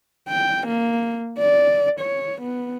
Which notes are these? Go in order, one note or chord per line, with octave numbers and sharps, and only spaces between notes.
G5
A#3
D5
C#5
B3